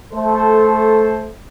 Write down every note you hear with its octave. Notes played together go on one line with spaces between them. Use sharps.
A3 A4 C5